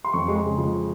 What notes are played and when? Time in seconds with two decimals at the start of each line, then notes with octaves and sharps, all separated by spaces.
0.04 C6
0.13 F2 C#6
0.28 G#3
0.36 C6
0.43 C#3
0.58 F3